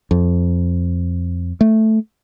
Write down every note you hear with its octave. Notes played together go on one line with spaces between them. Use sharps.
F2
A3